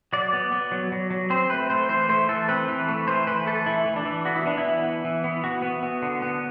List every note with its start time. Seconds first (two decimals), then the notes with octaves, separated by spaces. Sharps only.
0.13 F#3 D5
0.33 B3
0.52 B3
0.72 F#3
0.92 F#3
1.10 F#3
1.30 C4 C5
1.50 A3 B4
1.70 A3 C5
1.89 E3 C5
2.09 A3 C5
2.28 E3 A4
2.49 C4 B4
2.68 E3
2.88 A3
3.07 E3 C5
3.27 E3 B4
3.46 A3 A4
3.66 E3 E4
3.86 E3
3.96 D4
4.05 E3
4.25 B3 F#4
4.36 E4
4.46 B3 D4
4.58 E4
4.65 E3
4.84 B3
5.05 E3
5.24 B3
5.44 E3 F#4
5.62 B3
5.83 B3
6.02 D3
6.22 B3